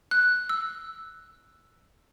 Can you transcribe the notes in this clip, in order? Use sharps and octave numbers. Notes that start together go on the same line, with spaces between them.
F#6
E6